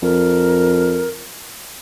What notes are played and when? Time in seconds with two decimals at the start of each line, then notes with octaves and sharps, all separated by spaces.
0.02 F2 A#4